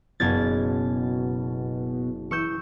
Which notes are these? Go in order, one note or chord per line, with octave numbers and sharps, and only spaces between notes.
F#1 B2 G#6 A6
E3 C#6 E6 G6